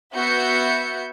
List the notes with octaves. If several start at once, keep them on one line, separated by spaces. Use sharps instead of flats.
B3 F#4 E5 G6 C#7